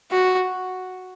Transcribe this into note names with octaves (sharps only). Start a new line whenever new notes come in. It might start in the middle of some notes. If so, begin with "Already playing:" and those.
F#4